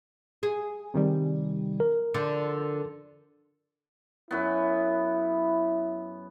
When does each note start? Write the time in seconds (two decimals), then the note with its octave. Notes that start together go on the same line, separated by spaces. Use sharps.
0.43 G#4
0.94 C3 D#3 G3
1.80 A#4
2.14 D3 F3 D5
4.31 F#2 B3 E4